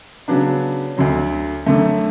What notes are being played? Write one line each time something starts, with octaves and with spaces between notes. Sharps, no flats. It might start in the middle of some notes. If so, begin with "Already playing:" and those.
C#3 F#3 B3 D4
D2 D3 F#3
F#2 D3 A3